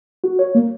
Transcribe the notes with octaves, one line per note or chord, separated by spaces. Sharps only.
F#4
C#5
A#3